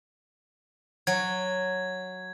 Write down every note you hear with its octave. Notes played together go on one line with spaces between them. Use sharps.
F#3 G#6